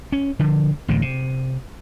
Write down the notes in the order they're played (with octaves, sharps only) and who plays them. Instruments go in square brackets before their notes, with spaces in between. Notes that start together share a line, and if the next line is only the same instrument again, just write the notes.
[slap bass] C#4
D3 F3
A1 D2 A2 D3
C3